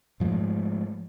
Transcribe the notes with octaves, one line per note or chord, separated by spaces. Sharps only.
G#2 F3 G#3 A3